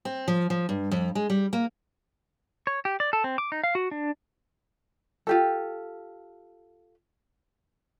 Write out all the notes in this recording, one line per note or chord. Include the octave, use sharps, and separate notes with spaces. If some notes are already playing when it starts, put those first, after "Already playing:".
C4
F3
F3
G2
F2
G#3
G3
A#3
C#5
G4
D5
A4
C4
D6
D#4
F5
F#4
D4
F4 G4 A4